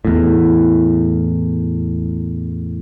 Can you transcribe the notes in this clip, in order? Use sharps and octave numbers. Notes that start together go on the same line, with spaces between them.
E2 A2